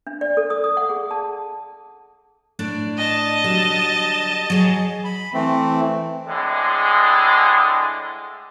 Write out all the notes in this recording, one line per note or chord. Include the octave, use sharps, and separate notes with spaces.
D4
D5
A4
D#6
D#6
F#5
G#4
A5
A2 D4 D5
D#5 A5
D3 F#3 G3
F#3 G#4
B5
E3 A3 C4
A2 D3 G#3